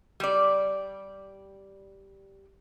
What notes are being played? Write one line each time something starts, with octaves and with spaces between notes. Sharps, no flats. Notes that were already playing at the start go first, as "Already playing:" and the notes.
G3 D5